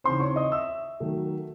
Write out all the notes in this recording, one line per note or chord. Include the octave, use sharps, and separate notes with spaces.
C#3 E3 C4 D#4 C5 C6
C#5 C#6
D#5 D#6
E5 E6
D#3 F#3 A3